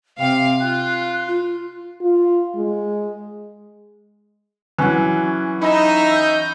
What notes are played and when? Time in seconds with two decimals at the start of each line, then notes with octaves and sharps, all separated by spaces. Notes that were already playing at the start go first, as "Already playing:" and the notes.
0.20 C3 F5 G5
0.59 F4 F#6
1.28 F4
2.02 F4
2.56 G#3
4.78 E3 F#3 C#4 F#5
5.62 D#4 E5 A#5 B5
6.14 G6